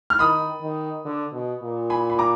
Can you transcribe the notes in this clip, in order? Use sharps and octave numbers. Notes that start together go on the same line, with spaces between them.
F6
D#3 B5 D#6
D#3
D3
B2
A#2
G#5 B5
B5
A#5 D6